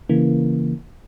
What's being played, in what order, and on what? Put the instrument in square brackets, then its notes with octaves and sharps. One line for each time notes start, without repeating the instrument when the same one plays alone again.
[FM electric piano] C#3 E3 A#3